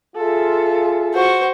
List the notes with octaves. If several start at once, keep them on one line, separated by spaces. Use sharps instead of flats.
F4 G#4 A4 E5
F#4 C5 C#6